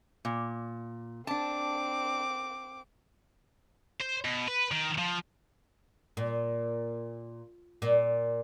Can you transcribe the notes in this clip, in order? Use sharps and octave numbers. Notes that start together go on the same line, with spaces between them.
A#2
C4 D4 A5 D6
C5
B2
B4
D#3
F3
A#2
A#2